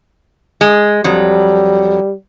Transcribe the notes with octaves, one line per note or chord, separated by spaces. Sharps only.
G#3
F2 F#3 G3